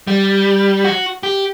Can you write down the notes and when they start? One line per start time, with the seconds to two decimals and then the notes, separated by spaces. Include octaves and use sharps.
0.07 G3
0.84 F#4
1.23 G4